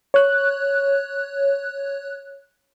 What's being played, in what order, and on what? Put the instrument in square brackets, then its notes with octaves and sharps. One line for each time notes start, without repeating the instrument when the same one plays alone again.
[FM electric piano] C#5 F#6